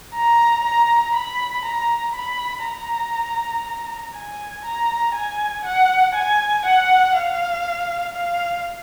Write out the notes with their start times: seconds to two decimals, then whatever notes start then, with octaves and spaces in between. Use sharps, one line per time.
0.15 A#5
0.64 A#5
1.14 B5
1.65 A#5
2.14 B5
2.65 A#5
4.15 G#5
4.65 A#5
5.15 G#5
5.64 F#5
6.15 G#5
6.65 F#5
7.15 F5
8.15 F5